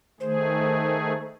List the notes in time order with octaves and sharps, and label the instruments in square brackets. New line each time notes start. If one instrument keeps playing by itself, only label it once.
[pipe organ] D#3 A3 G#4 [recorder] C5